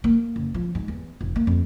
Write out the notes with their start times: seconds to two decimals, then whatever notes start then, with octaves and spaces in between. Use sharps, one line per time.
0.04 A#3
0.36 F#1
0.54 F3
0.75 G#2
0.88 E2
1.21 F1
1.36 A#3
1.47 F2